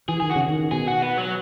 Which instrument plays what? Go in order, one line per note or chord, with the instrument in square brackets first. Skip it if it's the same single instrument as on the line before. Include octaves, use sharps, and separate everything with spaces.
[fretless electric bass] E3 [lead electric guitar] G#4
[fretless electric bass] D#3 [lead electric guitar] G#4
[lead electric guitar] F#4
[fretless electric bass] C#3
D#3
[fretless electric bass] B2 [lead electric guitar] G#4
[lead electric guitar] F#4
B3
F#3